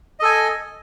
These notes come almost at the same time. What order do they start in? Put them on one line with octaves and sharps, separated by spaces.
D#5 A4 G#5